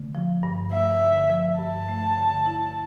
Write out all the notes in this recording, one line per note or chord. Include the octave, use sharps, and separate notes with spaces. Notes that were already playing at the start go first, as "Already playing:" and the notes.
Already playing: D3 A3
F3
G2
A3 E5
D3
F3
G2 A5
A3
D3
E4